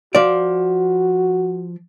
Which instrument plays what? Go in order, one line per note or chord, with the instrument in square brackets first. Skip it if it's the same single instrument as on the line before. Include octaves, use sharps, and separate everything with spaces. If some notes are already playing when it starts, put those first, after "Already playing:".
[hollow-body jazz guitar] F3 D5 [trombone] F#4